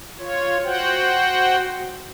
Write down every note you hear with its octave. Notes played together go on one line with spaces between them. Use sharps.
F4 C#5
F#4 C5 F#5 G5